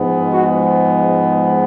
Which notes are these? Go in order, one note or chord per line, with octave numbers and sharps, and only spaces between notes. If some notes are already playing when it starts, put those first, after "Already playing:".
Already playing: G#2 F3 G#3 B3
F#4